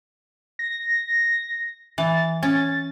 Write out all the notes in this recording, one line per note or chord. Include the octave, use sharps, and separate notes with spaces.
A#6
E3 A6
C#4 A6